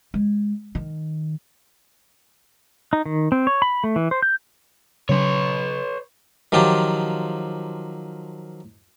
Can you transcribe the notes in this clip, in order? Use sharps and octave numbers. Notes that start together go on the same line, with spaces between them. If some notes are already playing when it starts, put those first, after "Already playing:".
G#3
D#3
D#4
D#3
C4
C#5
B5
A3
E3
C5
G6
C#3 F#3 C#4 B4 C#5
D#3 F3 F#3 F4 G4